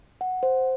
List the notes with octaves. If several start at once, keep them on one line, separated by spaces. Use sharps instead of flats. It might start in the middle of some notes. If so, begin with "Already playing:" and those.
F#5
C5